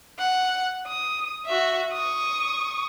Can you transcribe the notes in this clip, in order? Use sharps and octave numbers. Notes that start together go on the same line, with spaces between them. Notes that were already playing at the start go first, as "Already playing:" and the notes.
F#5
D#6
F#4 E5
C#6 D#6